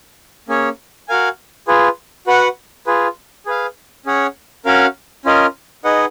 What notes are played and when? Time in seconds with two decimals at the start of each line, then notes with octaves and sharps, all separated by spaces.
0.49 A#3 C#4 G#4 C#5
1.08 F#4 A#4 F5 G#5
1.68 F4 G#4 B4
2.27 F#4 B4 F#5
2.87 F4 G#4 B4
3.46 G#4 B4 F5
4.06 C#4 G#4 C#5 F#5
4.65 C#4 F#4 A#4 F5
5.25 C#4 F4 A#4 D#5
5.84 D#4 G#4 B4 D#5 F#5